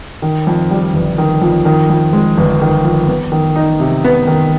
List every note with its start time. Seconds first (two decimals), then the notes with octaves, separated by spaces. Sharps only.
0.22 D#3
0.47 F2
0.71 G3
0.94 G1
1.18 D#3
1.42 F2
1.65 D#3
1.90 F2
2.13 G#3
2.38 G1
2.62 D#3
2.84 F2
3.08 B3
3.32 D#3
3.56 D#4
3.80 C3
4.04 B3
4.27 D#3